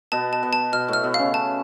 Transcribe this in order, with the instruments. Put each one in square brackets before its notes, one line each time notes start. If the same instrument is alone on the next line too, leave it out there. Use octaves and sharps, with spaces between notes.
[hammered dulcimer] B2 B3 [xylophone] A5
[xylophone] A5
[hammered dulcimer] B2 B3
[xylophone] A5
[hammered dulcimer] B2 B3 [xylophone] F6
[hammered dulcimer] A2 A3
[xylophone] F6
[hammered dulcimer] B2 B3
[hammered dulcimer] C#3 C#4 [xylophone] F5
[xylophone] A5